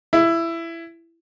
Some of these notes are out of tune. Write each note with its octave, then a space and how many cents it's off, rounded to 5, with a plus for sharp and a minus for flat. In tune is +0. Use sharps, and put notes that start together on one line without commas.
E4 +15